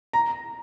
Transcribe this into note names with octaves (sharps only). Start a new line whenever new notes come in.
A#5